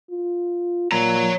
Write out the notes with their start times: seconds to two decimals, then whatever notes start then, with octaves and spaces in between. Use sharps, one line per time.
0.11 F4
0.92 A#2 C#5 A#5